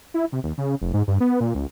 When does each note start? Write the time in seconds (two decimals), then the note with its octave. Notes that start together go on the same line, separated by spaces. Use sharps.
0.14 E4
0.32 C3
0.44 D#2
0.58 C#3
0.81 F1
0.94 G#2
1.08 G2
1.20 B3
1.41 A#2
1.55 C#2